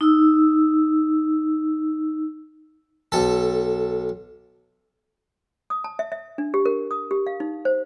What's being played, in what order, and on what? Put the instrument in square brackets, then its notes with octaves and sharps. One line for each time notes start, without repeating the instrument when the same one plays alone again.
[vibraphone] D#4 E6
[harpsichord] B1 A4
[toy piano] D#6
A5
E5
E5
D4
G4
A#4
D#6
G4
F5
D#4
C5